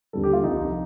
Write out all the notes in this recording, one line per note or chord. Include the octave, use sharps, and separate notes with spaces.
D#2 D3 G3 A4
G4
F4
C2 C3 F3 D#4